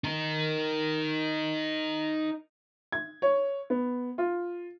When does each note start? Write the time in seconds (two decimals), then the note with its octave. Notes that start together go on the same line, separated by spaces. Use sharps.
0.04 D#4 A#4
2.92 G#6
3.22 C#5
3.70 B3
4.18 F4